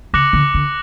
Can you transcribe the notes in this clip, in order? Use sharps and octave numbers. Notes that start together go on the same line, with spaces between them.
C#3 D6 F#6 A#6 C#7 F#7
D3
D3